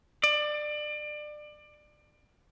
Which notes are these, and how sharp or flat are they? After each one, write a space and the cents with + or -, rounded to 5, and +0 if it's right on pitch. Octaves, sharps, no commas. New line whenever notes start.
D5 +25